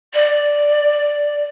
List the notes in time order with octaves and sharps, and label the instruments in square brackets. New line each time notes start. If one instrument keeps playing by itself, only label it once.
[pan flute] D5